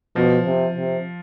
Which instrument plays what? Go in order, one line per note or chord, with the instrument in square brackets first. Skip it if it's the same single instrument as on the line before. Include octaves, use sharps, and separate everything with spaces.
[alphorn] B2 [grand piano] F3
[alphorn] C3
C3